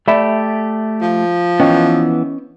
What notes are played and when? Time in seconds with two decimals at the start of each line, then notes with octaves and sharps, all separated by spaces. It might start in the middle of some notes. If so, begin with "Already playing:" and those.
0.08 A3 G4 D5 E5 B5
1.02 F3
1.60 E3 B3 C#4 D#5 G5